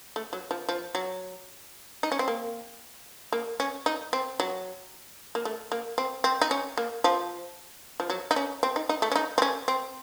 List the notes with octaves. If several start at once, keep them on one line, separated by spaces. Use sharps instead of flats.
A3
F#3
F3
F3
F#3
D#4
C#4
C4
A#3
A#3
C#4
D#4
C4
F#3
A#3
A3
A#3
C4
C4
D#4
C#4
A#3
F3
F3
F#3
D#4
C#4
C4
D#4
D#4
A3
C#4
D#4
C4
C#4
C4